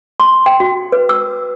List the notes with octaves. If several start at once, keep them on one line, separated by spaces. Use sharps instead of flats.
C6
G5
F#4
B4
E6